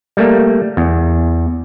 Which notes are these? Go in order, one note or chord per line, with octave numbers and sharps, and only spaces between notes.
G3 A3 A#3
E2